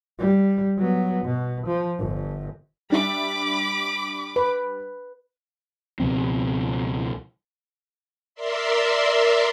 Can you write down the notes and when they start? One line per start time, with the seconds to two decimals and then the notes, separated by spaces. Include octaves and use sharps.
0.19 G3
0.78 F#3 B3
1.25 B2
1.67 F3
1.98 G1 G2
2.90 G3 D4 E5 B5 D6
4.36 B4
6.00 C#2 B2 F3 C4
8.35 A#4 D5 E5 C6